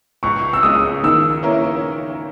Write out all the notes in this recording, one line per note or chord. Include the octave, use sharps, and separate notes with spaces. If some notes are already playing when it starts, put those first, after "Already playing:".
C#2 C#6
E6
C#3 G#3 D#6
D#3 E6
A#3 C#4 E4 A#4